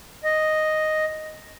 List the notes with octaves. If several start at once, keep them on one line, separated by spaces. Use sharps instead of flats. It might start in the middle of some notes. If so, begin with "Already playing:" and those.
D#5